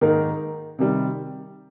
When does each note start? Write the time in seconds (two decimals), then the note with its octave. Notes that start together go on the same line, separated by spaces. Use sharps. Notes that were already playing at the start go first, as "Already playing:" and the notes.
0.01 G#2 D#3 A#3 D#4 A#4
0.79 C3 D#3 G3